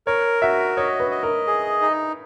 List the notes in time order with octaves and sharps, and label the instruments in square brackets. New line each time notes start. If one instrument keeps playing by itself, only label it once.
[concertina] A#4 [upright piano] C#5
[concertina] F#4 [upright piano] E5
[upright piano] C#5 [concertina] D#5
[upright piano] B4
[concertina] D#5
[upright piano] A#4
[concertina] G#4
D#4